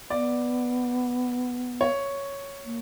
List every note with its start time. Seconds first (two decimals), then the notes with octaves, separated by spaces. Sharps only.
0.10 B3 D5
1.81 C#5
2.65 A#3